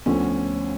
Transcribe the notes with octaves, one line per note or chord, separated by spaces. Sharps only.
D2 D3 F3 B3 C#4 F4